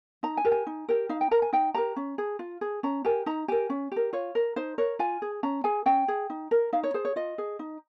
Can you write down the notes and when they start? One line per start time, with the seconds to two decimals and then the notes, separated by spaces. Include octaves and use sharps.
0.23 D#4 A#5
0.37 G#5
0.45 G4 A#4
0.52 G#5
0.67 D#4
0.89 G4 A#4
1.09 D#4 F5
1.21 G5
1.31 A#4 A#5
1.42 G#5
1.53 D#4 G5
1.74 G4 A#4 A#5
1.96 C#4
2.18 G#4
2.39 F4
2.61 G#4
2.83 C#4 A#5
3.05 G4 A#4 G#5
3.26 D#4 A#5
3.48 G4 A#4 G#5
3.70 C#4
3.92 G4 A#4
4.13 F4 C#5
4.35 A#4
4.56 D#4 C5
4.78 A#4 C#5
4.99 F4 G#5
5.22 G#4
5.43 C#4 A#5
5.64 G#4 G#5
5.86 C#4 G5
6.08 G#4
6.30 D#4
6.51 A#4
6.73 D#4 F5
6.83 C#5
6.94 G#4 C5
7.05 C#5
7.16 F4 D#5
7.38 G#4
7.59 D#4